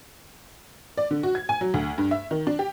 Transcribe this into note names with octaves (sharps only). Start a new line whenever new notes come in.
D5
D3
F#4
G#6
G#5
F#3
D2
G2
E5
D#3
D4
G4